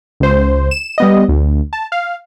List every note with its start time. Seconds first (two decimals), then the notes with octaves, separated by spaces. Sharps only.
0.20 C#2 C5
0.71 E7
0.98 G3 B3 D#5
1.29 D2
1.73 A5
1.92 F5